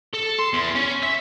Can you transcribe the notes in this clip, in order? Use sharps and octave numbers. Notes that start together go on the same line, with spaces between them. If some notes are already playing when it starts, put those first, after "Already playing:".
A4
C6
E2
C#4
E5